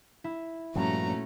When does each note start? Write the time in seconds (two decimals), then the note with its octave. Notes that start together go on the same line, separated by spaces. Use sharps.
0.24 E4
0.75 G2 A#2 F3 G3 A3 C#4 F#4 A#5